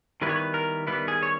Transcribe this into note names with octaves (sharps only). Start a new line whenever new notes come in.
D#3 G3 B3 E4 B4
C#5
B4
A#4
D#3 G3 B3 E4 B4
G#4
C#5